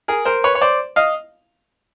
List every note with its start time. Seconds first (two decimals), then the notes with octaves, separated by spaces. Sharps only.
0.08 G#4 A#4
0.25 A#4 C5
0.44 B4 C#5
0.55 C#5
0.61 C5 D5
0.96 D#5 F5